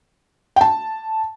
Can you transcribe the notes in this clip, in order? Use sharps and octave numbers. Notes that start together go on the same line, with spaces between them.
G5
A5